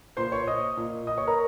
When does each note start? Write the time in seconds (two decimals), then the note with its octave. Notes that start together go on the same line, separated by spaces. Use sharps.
0.17 A#2 C5 C6
0.32 C#5 C#6
0.47 D#5 D#6
0.77 A#2
1.07 D#5 D#6
1.18 C#5 C#6
1.27 A#4 A#5